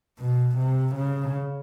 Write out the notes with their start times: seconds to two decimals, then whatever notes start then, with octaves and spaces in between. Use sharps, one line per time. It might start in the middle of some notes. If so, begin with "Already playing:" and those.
0.19 B2
0.58 C3
0.96 C#3